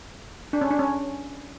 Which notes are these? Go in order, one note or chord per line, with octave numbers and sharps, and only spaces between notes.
D4
C#4
D4
C#4